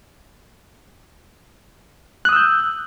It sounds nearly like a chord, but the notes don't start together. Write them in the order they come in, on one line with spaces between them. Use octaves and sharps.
F#6 D#6 E6 G6